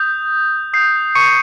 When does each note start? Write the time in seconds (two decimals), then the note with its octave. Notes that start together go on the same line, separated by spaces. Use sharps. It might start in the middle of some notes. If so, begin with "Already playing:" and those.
Already playing: D#6 G6
0.73 D#6 G6 C7
1.15 C#6 C#7